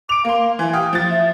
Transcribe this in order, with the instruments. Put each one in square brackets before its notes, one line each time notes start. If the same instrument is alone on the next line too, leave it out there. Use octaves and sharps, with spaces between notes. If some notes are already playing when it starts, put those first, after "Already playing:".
[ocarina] D6 [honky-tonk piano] D7 F7
[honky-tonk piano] A#3 C6 [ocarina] F5
[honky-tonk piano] E3 [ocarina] G#5
[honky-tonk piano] G4 F5 [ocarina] D#6
[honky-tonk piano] F3 A6
[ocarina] E5